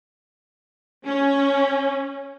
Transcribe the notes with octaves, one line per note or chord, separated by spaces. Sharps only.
C#4